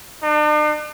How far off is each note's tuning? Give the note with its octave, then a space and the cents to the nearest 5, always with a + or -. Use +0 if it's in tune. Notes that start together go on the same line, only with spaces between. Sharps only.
D4 +45